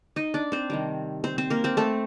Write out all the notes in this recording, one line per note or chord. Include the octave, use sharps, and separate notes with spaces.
D#4 D#5
D4 D5
C4 C5
C3 D#3 G3
C4 C5
C4 C5
A#3 A#4
C4 C5
A3 A4